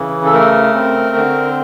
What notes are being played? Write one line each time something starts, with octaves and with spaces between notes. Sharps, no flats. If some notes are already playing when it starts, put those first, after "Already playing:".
Already playing: C#3 E3
A4
A3 A#4
C4
D3